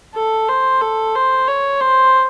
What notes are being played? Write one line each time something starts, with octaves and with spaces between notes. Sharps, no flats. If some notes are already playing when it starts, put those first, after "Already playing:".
A4
C5
A4
C5
C#5
C5